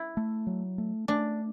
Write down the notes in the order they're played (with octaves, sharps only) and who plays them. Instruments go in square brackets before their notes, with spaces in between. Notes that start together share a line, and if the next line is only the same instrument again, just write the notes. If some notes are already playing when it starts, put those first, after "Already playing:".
Already playing: [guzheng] E4
[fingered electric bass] A3
F#3
A3
[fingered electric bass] A3 [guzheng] D4